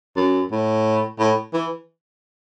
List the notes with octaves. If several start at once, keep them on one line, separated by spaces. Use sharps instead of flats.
F#2
A2
A2
E3